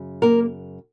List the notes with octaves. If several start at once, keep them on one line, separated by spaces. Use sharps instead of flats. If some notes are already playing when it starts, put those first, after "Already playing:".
Already playing: F#2 C#3
A#3 A#4